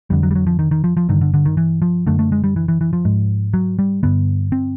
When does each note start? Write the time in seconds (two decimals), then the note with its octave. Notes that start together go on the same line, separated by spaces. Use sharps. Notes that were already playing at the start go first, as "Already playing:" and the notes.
0.10 F2 D3 G3
0.23 F#3
0.31 G3
0.35 F#3
0.47 F3
0.59 D#3
0.71 D#3
0.84 F3
0.97 F3
1.09 G2 D3 D#3
1.21 D3
1.34 D3
1.45 D#3
1.57 E3
1.82 F3
2.07 F#2 D3 A3
2.19 A3
2.32 G#3
2.44 G3
2.56 E3
2.68 E3
2.81 E3
2.93 F3
3.05 G#2
3.54 F#3
3.79 G3
4.03 G2 D3 B3
4.52 C4